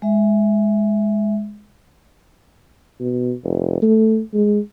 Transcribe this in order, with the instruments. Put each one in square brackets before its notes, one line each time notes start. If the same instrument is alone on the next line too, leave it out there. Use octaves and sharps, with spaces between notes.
[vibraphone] G#3 E5
[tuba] B2
F1
A3
G#3